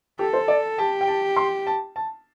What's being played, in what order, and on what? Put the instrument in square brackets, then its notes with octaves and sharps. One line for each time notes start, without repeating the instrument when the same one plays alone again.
[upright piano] G4 [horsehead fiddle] A4
[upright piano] C5
D5
[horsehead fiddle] G4 [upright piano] A5
[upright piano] G5
A5
C6
A5
A5